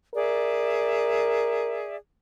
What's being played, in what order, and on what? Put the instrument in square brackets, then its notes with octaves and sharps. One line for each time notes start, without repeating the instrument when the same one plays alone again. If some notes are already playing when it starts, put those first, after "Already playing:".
[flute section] G#4 D5 E5 [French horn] A#4